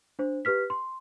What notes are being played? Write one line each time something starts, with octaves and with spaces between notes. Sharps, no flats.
D4 C5
G4 B4 F6 B6
C6